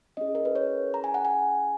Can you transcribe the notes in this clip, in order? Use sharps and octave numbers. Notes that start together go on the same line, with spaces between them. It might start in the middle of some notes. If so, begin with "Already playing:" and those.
C#4 E4 G#4 D#5
A#4
B4
C#5
A#5
G#5
F#5
G#5